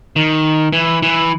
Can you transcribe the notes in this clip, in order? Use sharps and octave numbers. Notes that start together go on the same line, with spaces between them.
D#3
E3
E3